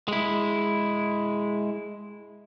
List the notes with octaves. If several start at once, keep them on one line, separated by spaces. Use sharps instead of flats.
G#3 E4